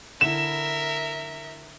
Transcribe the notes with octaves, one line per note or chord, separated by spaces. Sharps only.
D3 E4 A#4 E5 E7